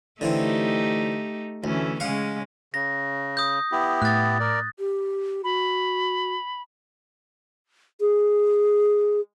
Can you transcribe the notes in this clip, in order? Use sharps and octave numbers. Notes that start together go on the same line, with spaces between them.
D3 E3 A3 C4 D#4 G4
D2 E3 A3 C#4
C#3 G#3 C#4 F5 F#5
C#3 A#6
D#6 G6
B3 E4 G4
A2 F#6 A6
A#4 D5
G4
F#4 B5
G#4